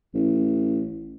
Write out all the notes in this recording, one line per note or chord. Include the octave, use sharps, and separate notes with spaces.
A1